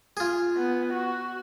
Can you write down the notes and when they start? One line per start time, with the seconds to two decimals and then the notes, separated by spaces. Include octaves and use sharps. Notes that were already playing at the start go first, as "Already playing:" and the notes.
0.17 F4 G#4
0.57 B3
0.94 F#4